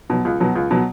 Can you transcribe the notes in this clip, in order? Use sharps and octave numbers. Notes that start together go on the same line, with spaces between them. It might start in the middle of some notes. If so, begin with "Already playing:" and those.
B2 F#3
C#2
B2 F#3
C#2
B2 F#3